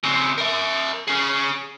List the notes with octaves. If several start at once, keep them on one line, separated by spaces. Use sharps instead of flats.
C#3 C4
A#4 E5
C#4 G#4